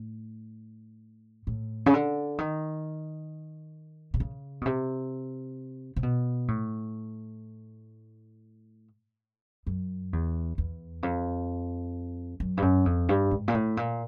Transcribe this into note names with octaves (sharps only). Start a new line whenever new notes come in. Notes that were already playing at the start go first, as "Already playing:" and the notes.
Already playing: A2
A2
C#3
D3
D#3
C3
C#3
B2
C3
C3
B2
A2
F#2
E2
E2
F2
F#2
G2
F#2
F2
G2
G#2
A#2
A2
A#2